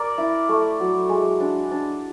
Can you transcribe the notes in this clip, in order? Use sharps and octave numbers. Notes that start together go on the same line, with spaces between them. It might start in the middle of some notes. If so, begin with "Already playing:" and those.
Already playing: A#4 D5
E4
A3
F#3
G#3
D4
D4